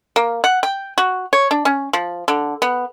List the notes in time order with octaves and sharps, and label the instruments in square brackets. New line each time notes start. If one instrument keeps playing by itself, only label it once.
[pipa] A#3
F#5
G5
F#4
C#5
D4
C#4
F3
D3
B3